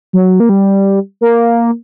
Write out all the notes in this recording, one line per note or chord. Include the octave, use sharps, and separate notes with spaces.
F#3
A#3
G3
A#3